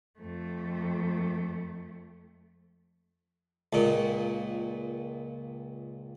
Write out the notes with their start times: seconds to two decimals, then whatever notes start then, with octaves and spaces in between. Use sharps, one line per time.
0.20 F2 A3
3.73 C#2 A#2